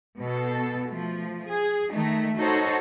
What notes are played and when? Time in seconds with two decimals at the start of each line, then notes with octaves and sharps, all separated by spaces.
0.20 B2 A4
0.89 F3 A3
1.46 G#4
1.91 D#3 A3 D#4
2.36 D#4 F#4 A4 C5 C#5